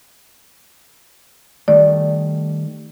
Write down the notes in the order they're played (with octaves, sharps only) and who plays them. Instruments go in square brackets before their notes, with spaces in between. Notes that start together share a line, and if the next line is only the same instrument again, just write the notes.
[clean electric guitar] D#3 G3 A3 [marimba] D5